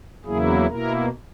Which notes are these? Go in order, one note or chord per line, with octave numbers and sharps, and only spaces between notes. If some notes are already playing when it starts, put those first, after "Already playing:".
E2 C#3 F#3 A#3 E4 G#4
B2 A#3 E4 A#4